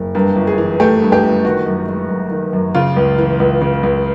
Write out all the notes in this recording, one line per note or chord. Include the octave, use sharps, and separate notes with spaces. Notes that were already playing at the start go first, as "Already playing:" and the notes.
Already playing: F#1
G2 A#4
G1
G#4
E3
A3 G4
G2
G4
G1
D#3 F#4
F#2
G#3
F#2
D#3
F#2
C#3 F4
C#2
E3
C#2
C#3
C#2